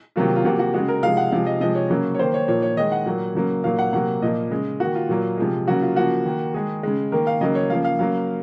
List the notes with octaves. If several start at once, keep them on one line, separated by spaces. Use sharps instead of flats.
C3 D#3 F#3 A#3 F4
F4
C3 F3 A#3 F#4
F#4
C#3 G#3 F#4
A#4
C3 F3 G#3 F5
F#5
C3 F3 G#3 F5
D#5
C3 F3 G#3 D#5
C#5
C#3 F#3 A#3
C#5
D#3 A#3 C5
C#5
A#2 F3 A#3 C#5
C#5
D#3 G#3 D#5
F#5
A#2 F#3 A#3
C#3 F#3 A#3
A#2 F#3 A#3 F5
F#5
C3 F#3 A#3 F#5
A#2 F3 A#3 D#5
C#3 G#3
D#3 A#3 F#4
F4
A#2 F#3 A#3
C3 F3 G#3
C#3 F#3 A#3 F#4
F4
C#3 F3 A#3 F#4
D#3 A#3
D#3 G#3 G#4
C#3 G#3
D#3 A#3 A#4
F5
C#3 F#3 A#3 D#5
C#5
C#3 F3 A#3 F5
F5
C#3 F#3 A#3 F5